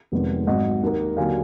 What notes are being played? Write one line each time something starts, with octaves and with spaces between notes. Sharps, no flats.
F1 F2 D#3 G#3 B3
G#1 G#2 F#3 D#5 F#5
D#2 D#3 A#3
D#2 D3 F#3 F5 G#5